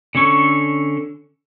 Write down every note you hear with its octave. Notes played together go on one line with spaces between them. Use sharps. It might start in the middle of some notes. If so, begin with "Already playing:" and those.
D3 C#4 A4 C#6